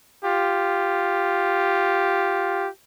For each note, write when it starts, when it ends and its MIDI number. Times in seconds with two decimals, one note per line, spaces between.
0.25 2.69 65
0.25 2.69 67